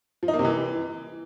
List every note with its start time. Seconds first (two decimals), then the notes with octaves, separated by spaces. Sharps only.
0.23 F3
0.28 D#4
0.34 A#3
0.39 C3
0.45 E3